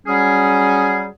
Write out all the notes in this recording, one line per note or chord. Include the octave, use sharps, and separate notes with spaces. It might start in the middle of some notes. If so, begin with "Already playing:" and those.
F#3 G3 C#4 G#4